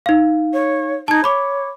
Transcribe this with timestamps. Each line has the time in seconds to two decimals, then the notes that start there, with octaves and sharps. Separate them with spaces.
0.06 D#4 F5
0.53 C#5
1.08 D#4 A5 G#6
1.24 C#5 B5 D6